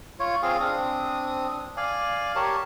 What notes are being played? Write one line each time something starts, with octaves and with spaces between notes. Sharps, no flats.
F4 C#5
C4 F4 G#4 F5
C4 D4 D#6
D5 F5 G#5
G4 A#4 C#5 A5